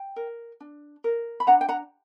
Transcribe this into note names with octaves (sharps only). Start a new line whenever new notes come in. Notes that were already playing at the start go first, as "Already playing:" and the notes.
Already playing: G5
A#4
D4
A#4
B5
D4 F#5 A#5
G5
F#5 A#5